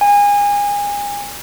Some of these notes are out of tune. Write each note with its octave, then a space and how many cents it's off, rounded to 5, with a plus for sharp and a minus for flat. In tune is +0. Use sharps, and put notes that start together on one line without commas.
G#5 -30